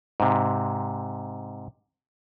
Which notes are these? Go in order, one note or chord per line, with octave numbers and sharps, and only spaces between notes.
G#2 C3